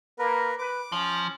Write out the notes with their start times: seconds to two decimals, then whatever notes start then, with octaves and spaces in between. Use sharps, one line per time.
0.19 A#3 A#4 B4
0.59 B4 D6
0.92 F3 C#4